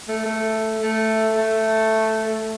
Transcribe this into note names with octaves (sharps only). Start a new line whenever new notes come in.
A3
A3
A3
A3